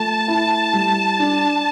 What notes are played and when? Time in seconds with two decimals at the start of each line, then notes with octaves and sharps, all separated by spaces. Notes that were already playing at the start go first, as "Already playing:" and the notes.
Already playing: F3 A3 A5
0.28 E4
0.73 G3
1.20 D4